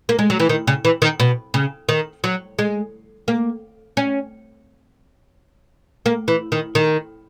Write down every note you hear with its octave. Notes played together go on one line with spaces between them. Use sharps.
A#3
G#3
F#3
E3
D#3
C#3
E3
D#3
B2
C#3
D#3
F#3
G#3
A#3
C#4
A#3
E3
D#3
D#3